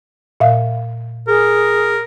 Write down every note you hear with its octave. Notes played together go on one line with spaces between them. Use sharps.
A#2 E5 F5
G#4 A#4